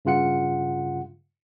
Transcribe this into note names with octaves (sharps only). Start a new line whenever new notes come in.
G2 C#3 F4 F#5 C#7